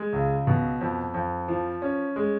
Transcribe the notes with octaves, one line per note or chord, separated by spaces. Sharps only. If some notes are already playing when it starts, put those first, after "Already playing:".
Already playing: G#3
C#2
B2
F2
F2
F3
C#4
G#3